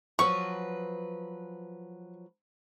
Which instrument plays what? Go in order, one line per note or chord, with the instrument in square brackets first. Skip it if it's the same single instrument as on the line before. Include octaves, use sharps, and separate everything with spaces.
[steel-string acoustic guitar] F3 F#3 B4 [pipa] C#6